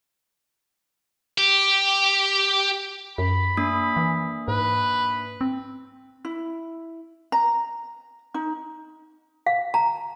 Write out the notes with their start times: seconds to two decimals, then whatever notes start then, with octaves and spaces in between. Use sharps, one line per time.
1.38 G4
3.18 F#2 B5
3.57 A#3 D4 D#6
3.97 E3
4.48 G#2 B4
5.41 C4
6.25 E4
7.32 A#5
8.34 D#4
9.46 F5
9.74 A#5